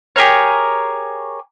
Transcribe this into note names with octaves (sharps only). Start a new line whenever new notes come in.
G4 G#4 A#4 C#5